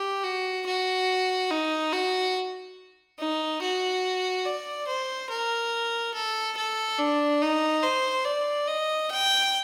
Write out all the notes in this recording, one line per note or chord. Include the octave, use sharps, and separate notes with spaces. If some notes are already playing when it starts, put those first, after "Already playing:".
Already playing: G4
F#4
F#4
D#4
F#4
D#4
F#4
D5
C5
A#4
A4
A4
D4
D#4
C5
D5
D#5
G5